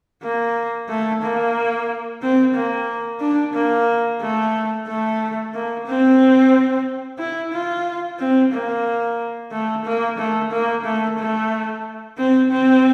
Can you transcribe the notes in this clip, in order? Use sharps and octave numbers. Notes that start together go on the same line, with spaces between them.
A#3
A3
A#3
C4
A#3
D4
A#3
A3
A3
A#3
C4
E4
F4
C4
A#3
A3
A#3
A3
A#3
A3
A3
C4
C4